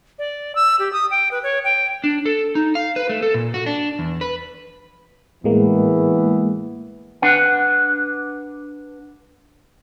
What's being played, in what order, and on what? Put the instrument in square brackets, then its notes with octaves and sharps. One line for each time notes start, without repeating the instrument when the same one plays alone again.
[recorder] D5
E6
G4
D#6
G5
B4
C#5
G5
[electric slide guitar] D4
A4
D#4
F5
B4
A3
A4
A#2
F#4
D4
E2
B4
[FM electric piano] A2 G#3 A#3 [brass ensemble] E3 B3
[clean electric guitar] D4 B4 F#5